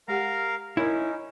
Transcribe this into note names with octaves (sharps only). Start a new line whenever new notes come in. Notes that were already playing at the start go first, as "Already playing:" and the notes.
G#3 G4 A#4 F5 F#5 A#5
C#4 D#4 E4 A#4 C#5